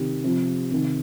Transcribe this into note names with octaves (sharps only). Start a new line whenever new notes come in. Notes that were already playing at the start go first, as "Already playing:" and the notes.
Already playing: C3 D#3 G4
C3 F3
C3 D#3